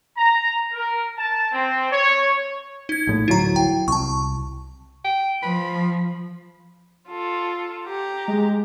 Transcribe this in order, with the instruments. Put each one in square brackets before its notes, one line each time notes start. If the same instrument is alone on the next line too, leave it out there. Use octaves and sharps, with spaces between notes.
[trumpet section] A#5
A#4
A5
C4
C#5
[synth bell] D#4 G#6
[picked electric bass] A#1 A2
[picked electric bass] D1 A#1 F#3 [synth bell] E4 A#5
[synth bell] G5
[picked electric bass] C2 [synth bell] A5 C#6
[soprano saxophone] G5
[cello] F3 [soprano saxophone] B5
[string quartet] F4 A4
G4 A#5
[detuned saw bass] G#3